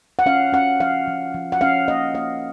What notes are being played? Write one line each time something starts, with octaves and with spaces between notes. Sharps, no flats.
F#5
C#4 F5
C#4 F#5
F3 F5
F3
F3
F#5
C#4 F5
A#3 D#5
A#3 F5